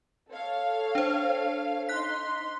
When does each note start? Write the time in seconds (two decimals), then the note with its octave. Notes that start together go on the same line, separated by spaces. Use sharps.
0.30 A4 C#5 F5
0.95 D4 C5
1.89 D#4 C6 F#6 B6